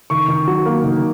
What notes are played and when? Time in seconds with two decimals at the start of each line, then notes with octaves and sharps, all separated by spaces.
0.10 D#3 C#6
0.28 D#3
0.47 F#3
0.66 A#3
0.84 D#3